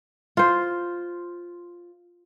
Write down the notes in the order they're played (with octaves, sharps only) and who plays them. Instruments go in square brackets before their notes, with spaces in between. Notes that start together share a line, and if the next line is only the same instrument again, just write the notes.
[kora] F4 C5